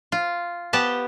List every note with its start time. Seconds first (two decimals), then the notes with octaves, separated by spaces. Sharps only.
0.12 F4
0.73 B3 G4 A5